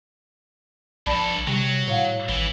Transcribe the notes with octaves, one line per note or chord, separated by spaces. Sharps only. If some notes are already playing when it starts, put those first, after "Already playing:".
A#1 G2 A4 D5 A5 B5
C3 F#3 G3
A2 C#5 F5 F#5
G#1 E3